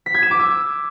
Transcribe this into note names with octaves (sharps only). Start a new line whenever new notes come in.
B6
G#6
E7
D6
E6